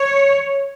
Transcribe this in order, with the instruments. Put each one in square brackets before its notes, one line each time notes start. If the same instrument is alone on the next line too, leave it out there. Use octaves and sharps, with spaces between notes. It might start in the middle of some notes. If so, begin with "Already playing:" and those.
Already playing: [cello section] C#5